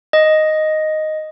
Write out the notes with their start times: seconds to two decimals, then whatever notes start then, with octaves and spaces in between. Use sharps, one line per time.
0.13 D#5